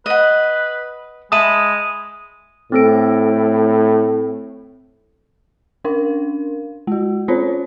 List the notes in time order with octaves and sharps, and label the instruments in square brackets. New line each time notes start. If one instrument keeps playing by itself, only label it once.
[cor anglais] B4 [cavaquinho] D#5 F#5
[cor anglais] G#3 [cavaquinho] E5 A5 B5 [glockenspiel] D#6 D#7
[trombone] A2 [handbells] C4 A4 D7
[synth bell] C#4 D4 A#4 F5
G#3 F#4
C4 C#4 F4 C5 C#5